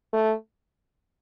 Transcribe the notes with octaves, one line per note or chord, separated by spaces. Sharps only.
A3